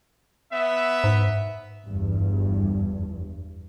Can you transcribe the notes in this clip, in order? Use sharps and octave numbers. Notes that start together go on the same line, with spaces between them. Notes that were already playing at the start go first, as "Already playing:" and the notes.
B3 E5
G#2
G1 E2 G2